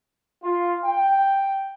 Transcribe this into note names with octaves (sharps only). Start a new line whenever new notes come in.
F4
G5